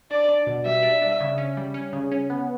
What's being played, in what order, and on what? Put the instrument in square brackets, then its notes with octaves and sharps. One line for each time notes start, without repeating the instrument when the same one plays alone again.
[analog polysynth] D4 [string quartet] D5
[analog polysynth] D4
B2
[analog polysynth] G3 [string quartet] E5
[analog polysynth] D4
D4
C#3
C#4
G3
C#4
C#3
C#4
B3